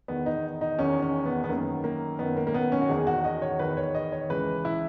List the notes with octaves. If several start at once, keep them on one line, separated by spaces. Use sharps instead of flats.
E2 D#3 B3
D#4
D#4
E2 D#3 C#4
C#4
B3
B3
F#2 D#3 A#3
A#3
F#2 D#3 B3
A#3
A#3
B3
C#4
F#4
E2 D#3 G#4
F#4
D#5
C#5
E2 D#3 B4
C#5
D#5
C#5
C#2 C#3 E3 B4
E4